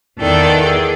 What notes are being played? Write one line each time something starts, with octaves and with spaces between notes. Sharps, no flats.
E2 D#3 A4 D5 G5
G#4